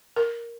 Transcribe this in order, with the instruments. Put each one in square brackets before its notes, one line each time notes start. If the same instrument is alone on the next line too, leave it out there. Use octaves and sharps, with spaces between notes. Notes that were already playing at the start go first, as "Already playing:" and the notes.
[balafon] A#4